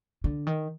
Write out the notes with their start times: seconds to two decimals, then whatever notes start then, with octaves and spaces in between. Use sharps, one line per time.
0.24 D3
0.47 D#3